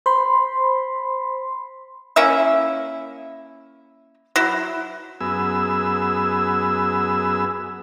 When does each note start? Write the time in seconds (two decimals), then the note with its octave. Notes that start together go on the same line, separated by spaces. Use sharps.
0.06 C5 B5 C6
2.16 A#3 C#4 E4 E5
4.36 F#3 E4
5.21 F#2 B3 G#4 E6